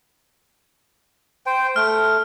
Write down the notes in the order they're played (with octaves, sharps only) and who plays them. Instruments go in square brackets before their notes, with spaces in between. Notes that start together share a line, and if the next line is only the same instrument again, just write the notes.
[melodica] C5 G5
[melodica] A3 [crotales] F6